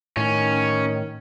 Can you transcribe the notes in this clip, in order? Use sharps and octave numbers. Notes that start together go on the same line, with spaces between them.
A2 D#3 C#4